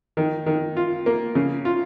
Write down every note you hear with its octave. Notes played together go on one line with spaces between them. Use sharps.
D#3
D#3
F4
A#3
C#3
F4